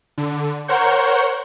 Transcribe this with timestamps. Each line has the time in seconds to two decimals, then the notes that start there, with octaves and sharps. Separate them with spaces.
0.18 D3
0.68 A#4 C5 C#5 F#5 C#6 G6